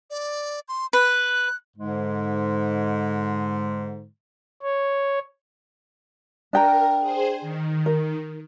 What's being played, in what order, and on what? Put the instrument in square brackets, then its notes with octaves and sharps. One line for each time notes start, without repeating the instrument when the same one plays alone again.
[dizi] D5
C6
[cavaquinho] B4 [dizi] F#6
[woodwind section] G#2 D3 G#3
[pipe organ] C#5
[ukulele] D4 G5 A#5 [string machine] A#4
[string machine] G#4 C5
D#3
[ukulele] A#4